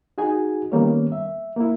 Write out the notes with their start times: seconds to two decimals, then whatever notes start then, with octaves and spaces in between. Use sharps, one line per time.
0.18 D#4 F#4 G#4 G#5
0.72 D#3 G3 A#3 B3 C#4 C#5
1.12 E5
1.56 A#3 E4